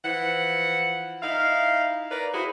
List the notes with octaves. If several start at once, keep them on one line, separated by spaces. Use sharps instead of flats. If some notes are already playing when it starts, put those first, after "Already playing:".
E3 F3 F#5
D#4 E4 F5
A#4 B4 D5
E4 F#4 G#4 C5